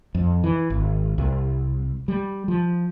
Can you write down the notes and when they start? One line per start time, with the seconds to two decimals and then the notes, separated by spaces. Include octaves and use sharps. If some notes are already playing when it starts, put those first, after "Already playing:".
0.15 F2
0.44 E3
0.70 G#1
1.18 C2
2.08 G3
2.48 F3